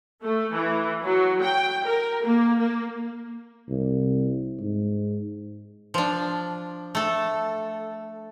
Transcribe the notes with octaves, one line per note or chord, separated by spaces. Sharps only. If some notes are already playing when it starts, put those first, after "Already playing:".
A3
E3
F#3
G5
A#4
A#3
A#3
C2
G#2
F3 D4
A3 A4